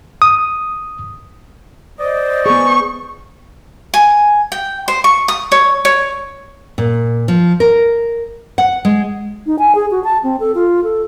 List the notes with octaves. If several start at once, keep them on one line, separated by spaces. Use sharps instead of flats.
D#6
C5 D5 D#5
B3 G#4 C#6
G#5
G5
C5
C#6
D#6
C#5
C#5
A#2
F3
A#4
F#5
G#3
D#4
G#5
G#4
F#4
A5
C4
A4
F4
A4